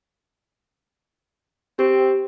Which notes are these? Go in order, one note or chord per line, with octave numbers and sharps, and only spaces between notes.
C4 G4